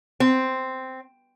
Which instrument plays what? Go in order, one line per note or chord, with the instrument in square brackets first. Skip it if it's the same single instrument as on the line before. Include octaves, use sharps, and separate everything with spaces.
[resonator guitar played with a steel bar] C4